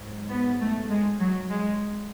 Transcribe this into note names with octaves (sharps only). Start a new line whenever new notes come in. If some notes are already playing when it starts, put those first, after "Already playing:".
Already playing: G#2 F#3
B3
A3
G#3
F#3
G#3